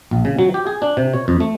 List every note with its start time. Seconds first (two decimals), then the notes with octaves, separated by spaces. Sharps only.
0.11 A#1
0.25 C#3
0.39 F#3
0.54 G4
0.67 G#4
0.82 D4
0.97 C3
1.14 C#5
1.28 F2
1.40 A3